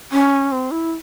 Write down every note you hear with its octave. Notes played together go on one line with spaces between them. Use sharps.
C#4
C4
E4